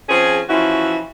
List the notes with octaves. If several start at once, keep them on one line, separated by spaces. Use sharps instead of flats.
F3 C4 C#4 G#4
E3 F3 C#4 E4 F#4